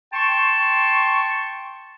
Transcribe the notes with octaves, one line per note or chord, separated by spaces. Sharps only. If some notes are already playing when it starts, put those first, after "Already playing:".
G5 A5 C6 C#6